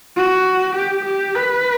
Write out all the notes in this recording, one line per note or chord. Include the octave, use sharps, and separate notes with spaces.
F#4
G4
G4
B4